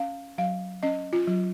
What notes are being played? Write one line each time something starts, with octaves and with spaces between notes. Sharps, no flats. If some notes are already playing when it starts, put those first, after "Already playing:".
Already playing: C#4 F5
F#3 F5
C#4 D#5
F4
F#3